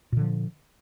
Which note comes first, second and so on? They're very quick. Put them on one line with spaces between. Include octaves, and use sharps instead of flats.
A#2 D3 F3